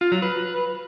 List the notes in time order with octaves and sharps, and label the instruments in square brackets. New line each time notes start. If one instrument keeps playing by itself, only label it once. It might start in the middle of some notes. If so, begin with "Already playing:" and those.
[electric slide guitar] F4
F#3
B4